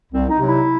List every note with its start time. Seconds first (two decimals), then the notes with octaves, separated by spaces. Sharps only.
0.12 C2 C4
0.29 D#4
0.39 C3 F#3
0.48 E4